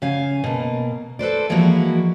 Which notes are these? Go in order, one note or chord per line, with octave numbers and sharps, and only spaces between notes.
C#3 F5 G#5
B2 A#3
A4 B4 C5 D5
E3 F3 G#3 A#3 E4 F#4